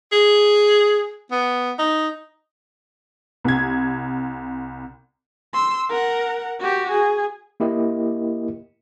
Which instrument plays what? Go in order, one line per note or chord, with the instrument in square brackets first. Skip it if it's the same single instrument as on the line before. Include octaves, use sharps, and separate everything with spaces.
[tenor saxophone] G#4
B3
D#4
[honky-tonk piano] C2 G#6
[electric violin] C6 E6
A#4 F#5
F#4 G4
G#4
[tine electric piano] A#3 E4 G4 A#4 D#5